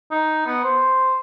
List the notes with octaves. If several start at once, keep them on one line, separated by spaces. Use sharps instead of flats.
D#4
B3
C5